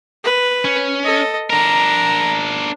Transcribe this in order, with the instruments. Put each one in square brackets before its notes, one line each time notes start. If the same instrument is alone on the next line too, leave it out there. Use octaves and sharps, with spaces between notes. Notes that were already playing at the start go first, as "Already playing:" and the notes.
[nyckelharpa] B4
[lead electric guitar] C#4
[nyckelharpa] A4 D#5
[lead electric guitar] D4 A#4 [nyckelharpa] A#5